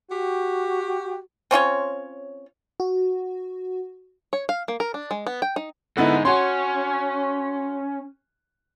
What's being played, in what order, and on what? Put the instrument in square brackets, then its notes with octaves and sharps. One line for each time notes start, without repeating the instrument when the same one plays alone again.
[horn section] F#4 G4
[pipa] C4 C#4 F4 C#5
[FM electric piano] F#4
[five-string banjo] C#5
F5
A#3
A#4
D4
G#3
B3
G5
D#4
[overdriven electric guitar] G#2 D#4 [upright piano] D3 B3 E4
[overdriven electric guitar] C#4 [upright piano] F#4 C6